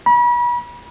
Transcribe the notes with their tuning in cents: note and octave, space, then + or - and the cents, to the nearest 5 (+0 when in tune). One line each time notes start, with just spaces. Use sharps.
B5 -35